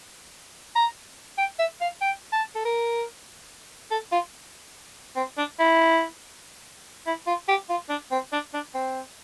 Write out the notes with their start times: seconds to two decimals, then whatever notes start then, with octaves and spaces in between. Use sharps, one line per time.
0.76 A#5
1.38 G5
1.59 E5
1.81 F5
2.01 G5
2.33 A5
2.55 A4
2.65 A#4
3.91 A4
4.12 F4
5.16 C4
5.38 D4
5.59 E4
7.07 E4
7.27 F4
7.48 G4
7.70 F4
7.89 D4
8.12 C4
8.32 D4
8.54 D4
8.75 C4